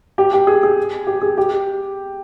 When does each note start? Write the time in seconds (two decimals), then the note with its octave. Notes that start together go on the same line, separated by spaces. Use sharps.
0.18 G4
0.33 G4
0.47 G#4
0.63 G#4
1.07 G4
1.22 G#4
1.37 G4